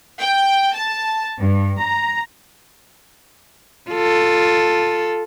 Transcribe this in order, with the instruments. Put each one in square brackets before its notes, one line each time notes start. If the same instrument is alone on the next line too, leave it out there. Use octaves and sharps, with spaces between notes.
[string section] G5
A5
G2
A#5
[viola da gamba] F4 A4